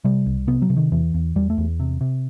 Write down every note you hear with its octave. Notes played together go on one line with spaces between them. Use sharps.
C3 G3
C2
C3 B3
F#3
C3
D#3
E2 E3
E2
E2 G3
A3
E2
C3
C3